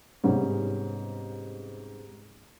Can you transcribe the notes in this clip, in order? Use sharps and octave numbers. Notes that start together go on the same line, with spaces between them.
G#2 C3 G3 B3 C#4